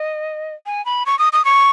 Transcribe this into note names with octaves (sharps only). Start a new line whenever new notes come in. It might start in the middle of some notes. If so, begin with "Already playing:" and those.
Already playing: D#5
G#5
B5
C#6
D#6
D#6
C#6